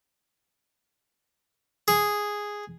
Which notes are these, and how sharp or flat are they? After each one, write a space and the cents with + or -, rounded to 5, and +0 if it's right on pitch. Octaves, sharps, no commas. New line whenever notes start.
G#4 -5